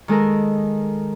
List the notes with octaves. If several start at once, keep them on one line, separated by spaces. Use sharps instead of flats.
D#3 G#3 A4 A#4